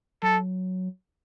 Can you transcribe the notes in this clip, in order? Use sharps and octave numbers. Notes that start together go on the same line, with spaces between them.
F#3 A4